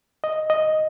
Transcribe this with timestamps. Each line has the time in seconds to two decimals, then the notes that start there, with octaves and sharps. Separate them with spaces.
0.24 D#5
0.50 D#5